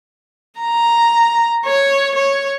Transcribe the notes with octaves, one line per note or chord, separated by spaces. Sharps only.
A#5
C#5
C#5